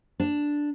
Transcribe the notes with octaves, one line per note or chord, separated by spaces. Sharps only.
D4